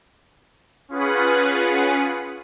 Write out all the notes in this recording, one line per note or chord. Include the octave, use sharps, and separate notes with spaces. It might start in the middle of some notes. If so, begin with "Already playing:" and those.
C#4 F4 G#4 B4 F#5